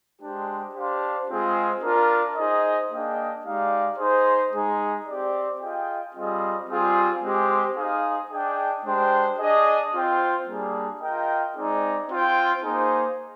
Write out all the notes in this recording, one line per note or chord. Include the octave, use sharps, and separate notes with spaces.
G#3 D4 G4 C5 G5
D4 G4 C5 F5
G#3 C4 F4 G#4 C5
D4 F4 A#4
D#4 G#4 C5 D#5
A#3 D4 G#4 D#5 G5
G#3 D#4 G4 D5 F5
D#4 G#4 C5
G#3 D#4 G#4
C4 G4 D5
F4 G#4 D#5 G5
G3 C4 F4 G#4 D#5
G3 C4 F4 G#4
G#3 C4 G4 C5
D#4 G#4 C5 F5
D4 G#4 D#5 G5
G#3 D4 G4 C5 G5
D4 G#4 D#5
C4 F4 C5 G5
G3 A#3 D4 G#4
F4 A#4 D#5 G5
G#3 C4 D#4 G#4 D5
C4 F4 C5 G5
A#3 D#4 G#4 C5